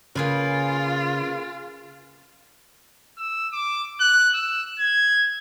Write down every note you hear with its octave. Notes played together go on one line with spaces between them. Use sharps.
C#3 A#3 F4 G#4 B4
E6
D6
F#6
E6
G#6